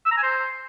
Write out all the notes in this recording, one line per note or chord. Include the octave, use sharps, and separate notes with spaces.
E6
A#5
G#5
C5